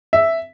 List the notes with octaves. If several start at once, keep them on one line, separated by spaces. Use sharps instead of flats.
E5